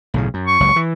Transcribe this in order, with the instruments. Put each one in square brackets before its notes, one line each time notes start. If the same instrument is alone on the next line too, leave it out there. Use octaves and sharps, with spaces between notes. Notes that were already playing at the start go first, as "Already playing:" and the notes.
[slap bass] B1 A2 C#3
F#2
[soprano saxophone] C#6
[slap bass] F#1 C#2 F#3
E3